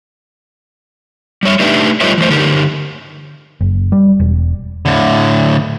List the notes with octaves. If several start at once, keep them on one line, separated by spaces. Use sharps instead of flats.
G3 A3 C#5 E5
A3 D4 D#4 G4 B4 E5
G3 F4 B4 C#5 D#5 E5
E3 A3 C5
D3 D#4 G4 A#4
F#1
G3
E1
A2 D3